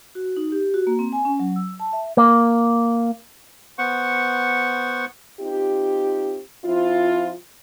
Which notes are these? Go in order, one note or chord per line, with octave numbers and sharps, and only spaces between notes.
F#4
D#4
G4
F#4
A#3
C4
G#5
C#4
F#3
E6
A5
E5
A#3
B3 C5 F#5 C#6
C4 D#4 F4 G4
F3 C4 E4 F4